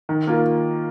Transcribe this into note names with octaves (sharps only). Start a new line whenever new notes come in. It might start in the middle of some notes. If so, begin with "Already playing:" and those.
D#3
A#3 F4 A#4